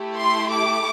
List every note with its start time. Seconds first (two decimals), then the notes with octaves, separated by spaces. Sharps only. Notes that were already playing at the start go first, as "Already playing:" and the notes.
Already playing: A3 E4 G4
0.17 C6
0.53 D6